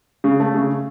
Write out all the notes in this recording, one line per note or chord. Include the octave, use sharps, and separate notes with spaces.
C#3
A3
C#3